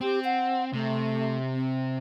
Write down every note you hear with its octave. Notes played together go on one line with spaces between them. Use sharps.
C4 G4
F#5
C3 A3
C4